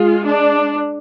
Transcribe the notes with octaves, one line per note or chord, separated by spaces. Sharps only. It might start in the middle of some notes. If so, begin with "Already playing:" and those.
Already playing: G#3 F4
D4